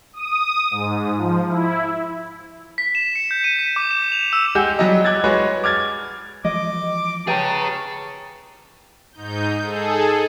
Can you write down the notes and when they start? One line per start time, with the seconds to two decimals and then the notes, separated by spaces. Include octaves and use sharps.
0.13 D#6
0.71 G#2
1.17 F3
1.49 E4
2.78 B6
2.95 E7
3.16 C#7
3.31 G6
3.44 D#7
3.59 B6
3.76 D6
3.91 E7
4.12 F7
4.33 E6
4.55 G#3 G4 F#5 G#5 G6
4.79 F#3 G3 D#5
5.05 D6 F#6 G#6 A6
5.24 G#3 F#4 B4 C#5
5.64 D6 F6 G#6 A6
6.45 E3 F3 G#3 D#5 D6
7.27 G#4 B4 C#5 G5 A5 A#5
9.12 G#2 D#4 G6
9.64 G#4 A4